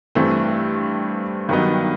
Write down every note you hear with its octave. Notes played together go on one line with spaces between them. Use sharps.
G2 E3 A3 C4
G2 D#3 F#3 B3 D#4